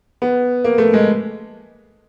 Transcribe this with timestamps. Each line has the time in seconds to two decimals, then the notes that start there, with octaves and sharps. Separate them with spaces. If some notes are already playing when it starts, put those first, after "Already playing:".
0.22 B3
0.64 A#3
0.78 A3
0.93 G#3